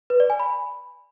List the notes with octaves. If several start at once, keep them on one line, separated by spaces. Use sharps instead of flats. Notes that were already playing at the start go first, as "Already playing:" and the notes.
B4
D5
G#5
B5